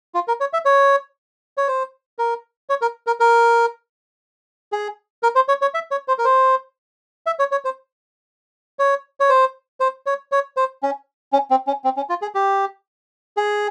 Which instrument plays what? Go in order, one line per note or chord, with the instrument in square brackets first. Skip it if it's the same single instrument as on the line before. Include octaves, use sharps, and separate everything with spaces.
[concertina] F4
A#4
C#5
E5
C#5
C#5
C5
A#4
C#5
A#4
A#4
A#4
G#4
A#4
C5
C#5
C#5
E5
C#5
C5
A#4
C5
E5
C#5
C#5
C5
C#5
C#5
C5
C5
C#5
C#5
C5
C#4
C#4
C4
C#4
C4
C#4
F4
G#4
G4
G#4